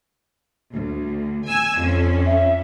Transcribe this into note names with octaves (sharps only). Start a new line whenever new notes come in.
D2
G#5 E6
F2 C#4
E5